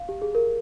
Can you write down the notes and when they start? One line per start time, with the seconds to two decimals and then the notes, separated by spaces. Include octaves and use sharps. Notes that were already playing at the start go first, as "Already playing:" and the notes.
Already playing: F5
0.09 G4
0.22 G#4
0.35 A#4